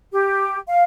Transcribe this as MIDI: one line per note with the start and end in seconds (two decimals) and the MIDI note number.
0.13 0.57 67
0.68 0.83 77